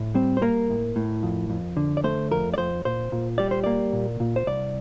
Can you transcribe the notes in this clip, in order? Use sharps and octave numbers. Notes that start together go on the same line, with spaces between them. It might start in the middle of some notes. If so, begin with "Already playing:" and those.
Already playing: A2
G3 C4
C5
A#3 A#4
A2
A2
F2
F2
D3
D5
A3 C5
F2 A#4
D5
F2 C5
A#2 C5
A#2
G3 D5
C5
A#3 D5
A#2
A#2
C5
C2 D5